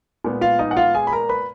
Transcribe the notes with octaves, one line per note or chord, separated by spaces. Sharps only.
A#2 G#3 B3
F4 F5
D#4 D#5
F#5
F4 F5
G#4 G#5
B5
A#4 A#5
B4 B5